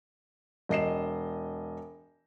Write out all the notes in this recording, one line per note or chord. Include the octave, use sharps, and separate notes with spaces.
E1 D#5 C7 E7